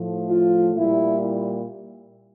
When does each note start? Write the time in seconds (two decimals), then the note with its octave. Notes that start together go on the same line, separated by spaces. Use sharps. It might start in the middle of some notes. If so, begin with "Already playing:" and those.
Already playing: A2 F3 A3
0.28 F4
0.74 A#2 G3 E4